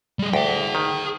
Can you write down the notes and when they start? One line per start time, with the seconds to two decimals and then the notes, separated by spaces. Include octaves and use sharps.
0.19 G3 G#4
0.34 D2 G#4 G5
0.75 D#3